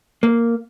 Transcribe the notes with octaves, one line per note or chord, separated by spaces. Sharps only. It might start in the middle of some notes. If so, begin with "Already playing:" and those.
A#3